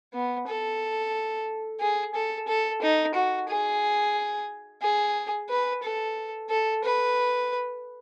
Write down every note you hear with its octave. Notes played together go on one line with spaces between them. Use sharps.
B3
A4
G#4
A4
A4
D#4
F#4
G#4
G#4
B4
A4
A4
B4